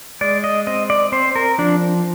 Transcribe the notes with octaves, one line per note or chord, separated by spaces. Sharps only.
G#3 D5
D#5
C4 D#5
D5
C4 C5
A#4
F3 D4